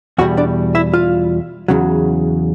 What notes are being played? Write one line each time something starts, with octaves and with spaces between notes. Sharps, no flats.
E2 B2 G3 F#4 F#5
D4 D5
E4 E5
F4 F5
E2 C#3 F#3